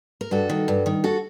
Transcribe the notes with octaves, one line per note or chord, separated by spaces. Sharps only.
A#4
G2 F#4 A4
D#3
G2
D#3
F#4 A4